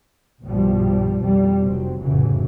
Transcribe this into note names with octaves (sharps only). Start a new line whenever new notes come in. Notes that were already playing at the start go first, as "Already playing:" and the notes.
B1 G2 B2 D#3 F3 G3
F2 B2 G3
F1 F#3 C4
F1 F#2 A2 C#3 E3 F#3